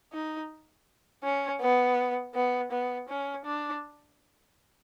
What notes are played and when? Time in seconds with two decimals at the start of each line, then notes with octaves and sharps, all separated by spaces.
0.13 D#4
1.23 C#4
1.61 B3
2.35 B3
2.71 B3
3.09 C#4
3.45 D4